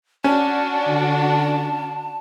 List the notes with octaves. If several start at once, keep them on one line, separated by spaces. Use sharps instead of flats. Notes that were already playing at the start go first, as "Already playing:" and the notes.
C#4 D4 F#4 A5
D3